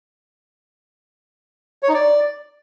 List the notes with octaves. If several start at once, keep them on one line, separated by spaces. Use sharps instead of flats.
C#5
D#4
D5